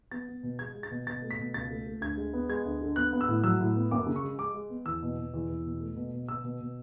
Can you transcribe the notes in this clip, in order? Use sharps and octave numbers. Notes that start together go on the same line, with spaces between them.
B3 A6
B3
B2
G#3 G#6
G#3
A6
B2
B2 A6
A3
B6
B2
C#2 A6
A3
A3
D2 G#6
G#3
B3
G#3 G#6
D2
D3
B3 F#6
B3
E6
A2
F#3 E6
A2
B3
F#2 D6
C#3
C#6
G#3
G#3 D6
G#3
B3
E2 E6
B2
B2
E2
E2
B2
A3
B2
B2
B2 E6
B2
B2